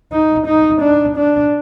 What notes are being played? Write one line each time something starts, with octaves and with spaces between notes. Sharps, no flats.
D#4
D#4
D4
D4